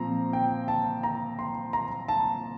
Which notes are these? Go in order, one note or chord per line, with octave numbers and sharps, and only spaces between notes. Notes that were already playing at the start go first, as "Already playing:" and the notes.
Already playing: A#2 F3 C4 A#5
G5
A5
A#5
C6
A#5
A5